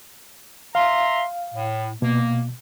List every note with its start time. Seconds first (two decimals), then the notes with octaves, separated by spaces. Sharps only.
0.75 E5 F5 A#5 C6
1.54 A2
2.02 B2 A#3